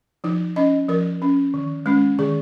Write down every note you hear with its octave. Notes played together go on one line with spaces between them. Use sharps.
F3 D#4
C#4 D#5
F3 A#4
C#4
D#3
G#3 C#4
D#3 G#4